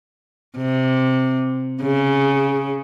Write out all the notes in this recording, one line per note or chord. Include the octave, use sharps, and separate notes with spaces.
C3
C#3